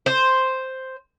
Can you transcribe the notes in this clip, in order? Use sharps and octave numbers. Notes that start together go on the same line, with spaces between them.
C5